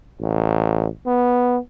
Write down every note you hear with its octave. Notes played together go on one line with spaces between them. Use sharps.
A1
B3